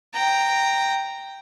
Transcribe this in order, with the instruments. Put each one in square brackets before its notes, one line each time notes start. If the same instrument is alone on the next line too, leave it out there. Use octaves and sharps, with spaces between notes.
[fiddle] G5 A#5